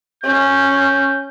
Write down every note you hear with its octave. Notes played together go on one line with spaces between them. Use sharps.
C#4 G6